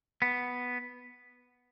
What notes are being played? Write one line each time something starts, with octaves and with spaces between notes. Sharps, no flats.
B3